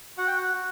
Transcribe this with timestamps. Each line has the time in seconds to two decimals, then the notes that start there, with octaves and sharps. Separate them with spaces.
0.18 F#4 F#5
0.27 G5
0.37 F#5
0.54 F#4